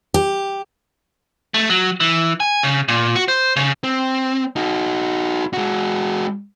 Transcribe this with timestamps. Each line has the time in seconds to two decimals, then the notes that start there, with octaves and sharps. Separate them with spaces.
0.14 G4
1.54 A3
1.69 F#3
2.00 E3
2.40 G#5
2.63 C#3
2.88 A#2
3.15 F#4
3.28 C5
3.56 C#3
3.84 C4
4.56 D#4 F#4
5.53 G#3 F#4